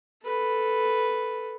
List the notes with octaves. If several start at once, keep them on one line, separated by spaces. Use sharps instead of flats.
A4 B4